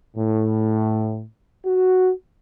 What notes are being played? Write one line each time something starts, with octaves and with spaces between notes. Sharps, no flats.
A2
F#4